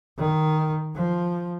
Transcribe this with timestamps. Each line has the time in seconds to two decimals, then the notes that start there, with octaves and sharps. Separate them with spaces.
0.18 D#3
0.95 F3